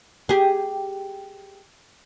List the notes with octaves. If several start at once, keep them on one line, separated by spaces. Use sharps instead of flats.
G4 G#4